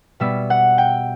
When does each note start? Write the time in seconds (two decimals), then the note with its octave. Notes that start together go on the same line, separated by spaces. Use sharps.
0.20 B2 G3 B3 E5
0.50 F#5
0.78 G5